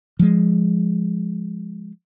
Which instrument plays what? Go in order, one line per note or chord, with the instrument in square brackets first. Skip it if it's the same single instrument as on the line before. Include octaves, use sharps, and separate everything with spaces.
[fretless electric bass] F3 G#3